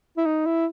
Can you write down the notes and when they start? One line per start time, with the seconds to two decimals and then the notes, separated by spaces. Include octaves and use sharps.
0.17 E4
0.26 D#4
0.46 E4